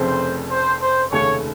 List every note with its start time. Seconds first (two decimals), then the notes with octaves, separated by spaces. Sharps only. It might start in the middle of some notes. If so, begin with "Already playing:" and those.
Already playing: F1 F2 C#3 A3 C4 C5
0.51 C5
0.81 C5
1.11 F1 D#2 C#3 A3 C#5